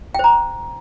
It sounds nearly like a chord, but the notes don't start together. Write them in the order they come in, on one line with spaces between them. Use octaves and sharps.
G5 C5 A#5